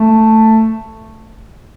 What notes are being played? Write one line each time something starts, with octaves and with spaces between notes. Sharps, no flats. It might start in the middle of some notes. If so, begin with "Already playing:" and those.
Already playing: A3